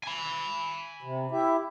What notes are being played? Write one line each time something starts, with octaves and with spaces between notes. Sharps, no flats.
G#5 B5
C3
E4 G4 E5